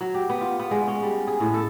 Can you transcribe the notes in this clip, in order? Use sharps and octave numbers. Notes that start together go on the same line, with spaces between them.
F#3
G4
B3
F4
B3
G#3
C#4
G3
G#4
A2
A4